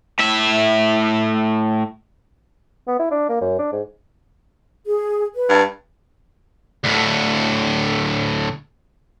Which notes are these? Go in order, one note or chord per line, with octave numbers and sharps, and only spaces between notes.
A2 E5
B3
E4
D4
A#3
F#2
D4
G#2
G#4
B4
G2
D2 A2